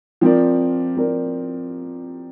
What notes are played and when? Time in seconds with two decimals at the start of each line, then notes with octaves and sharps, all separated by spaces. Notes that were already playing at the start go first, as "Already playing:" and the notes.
0.21 F3 C4 A#4 D5
0.96 F3 C4 A#4 D5